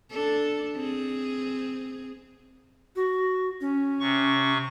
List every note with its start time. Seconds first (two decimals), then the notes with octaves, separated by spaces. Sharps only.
0.10 D4 A4
0.76 C4 G#4
2.96 F#4
3.61 C#4
4.00 C3 C#6